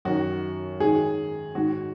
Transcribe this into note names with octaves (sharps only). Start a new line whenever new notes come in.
F#2 D#3 F#4
G#2 D#3 G#4
G#2 D#3 F#4